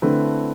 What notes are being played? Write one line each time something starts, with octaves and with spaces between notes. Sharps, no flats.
D3 A3 C4 E4 B4